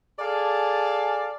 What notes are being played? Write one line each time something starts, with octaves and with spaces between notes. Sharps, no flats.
G#4 A4 D5 F5 G#5 A5